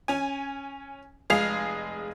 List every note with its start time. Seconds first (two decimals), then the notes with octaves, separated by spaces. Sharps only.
0.08 C#4 G#5
1.30 F1 G#3 G#4 F5 C7 F7